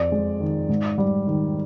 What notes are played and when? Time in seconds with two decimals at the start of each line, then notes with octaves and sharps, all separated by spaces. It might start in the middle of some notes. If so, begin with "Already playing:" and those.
Already playing: F2 D5
0.12 G#3
0.40 D#3
0.69 G#2
0.98 G3
1.27 D#3